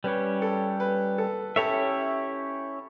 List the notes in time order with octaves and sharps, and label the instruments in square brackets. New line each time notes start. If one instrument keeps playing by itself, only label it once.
[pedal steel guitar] G3 C#4 G4 C#5 [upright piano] B4
[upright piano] A4
B4
A4
[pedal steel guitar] C#4 E4 G4 C#5 E5 [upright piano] A4